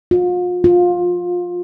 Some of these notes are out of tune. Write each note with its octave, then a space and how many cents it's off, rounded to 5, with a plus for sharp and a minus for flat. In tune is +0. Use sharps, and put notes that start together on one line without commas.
F4 +40
F4 +20